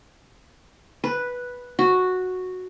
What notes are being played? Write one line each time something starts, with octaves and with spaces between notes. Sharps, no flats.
B4
F#4